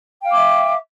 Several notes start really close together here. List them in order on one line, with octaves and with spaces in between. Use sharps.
G5 F5 D6 E5